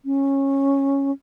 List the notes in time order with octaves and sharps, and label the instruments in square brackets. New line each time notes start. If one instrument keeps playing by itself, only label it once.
[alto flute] C#4